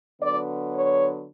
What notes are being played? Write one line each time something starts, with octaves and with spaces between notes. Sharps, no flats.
D3 F#3 B3 D5
C#5